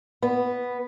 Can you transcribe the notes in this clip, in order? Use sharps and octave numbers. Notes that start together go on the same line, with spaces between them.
B3